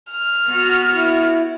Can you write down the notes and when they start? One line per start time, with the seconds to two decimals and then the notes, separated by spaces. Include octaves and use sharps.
0.11 F6
0.48 B3 F#4
0.93 E4